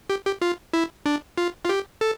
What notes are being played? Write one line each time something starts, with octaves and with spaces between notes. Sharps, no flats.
G4
G4
F4
E4
D4
F4
F4
G4
A4